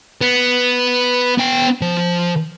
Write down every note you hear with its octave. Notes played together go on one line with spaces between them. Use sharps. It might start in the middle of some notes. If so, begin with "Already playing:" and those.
B3
B3 G5
F3